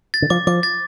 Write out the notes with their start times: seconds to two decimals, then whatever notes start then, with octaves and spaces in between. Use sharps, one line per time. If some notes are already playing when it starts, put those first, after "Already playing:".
0.14 A6
0.22 D3
0.30 F3 D6
0.47 F3 D6
0.63 A6